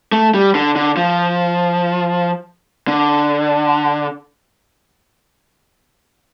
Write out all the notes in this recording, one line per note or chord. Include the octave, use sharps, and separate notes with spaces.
A3
G3
D3
D3
F3
D3